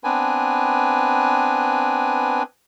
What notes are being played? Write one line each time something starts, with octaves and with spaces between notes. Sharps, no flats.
B3 C4 D4 B4 G#5